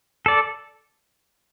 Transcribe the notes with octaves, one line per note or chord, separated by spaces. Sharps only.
A4 D5